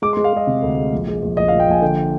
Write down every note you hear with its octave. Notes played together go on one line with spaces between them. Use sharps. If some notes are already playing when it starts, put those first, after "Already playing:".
G#3 D6
C6
G#3
F5
G#3 D#5
C3
D2
G#3
A#1
G#3
A#1
A#1 D#5
F5
A#2
G5
A#1 G#5
D3 G5